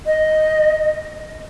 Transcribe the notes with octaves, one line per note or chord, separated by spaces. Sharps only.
D#5